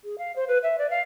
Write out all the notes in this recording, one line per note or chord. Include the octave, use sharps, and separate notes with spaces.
G#4
F5
C5
B4
E5
D5
F5